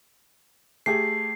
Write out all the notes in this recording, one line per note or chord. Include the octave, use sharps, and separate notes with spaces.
A3 G4 G#4 C7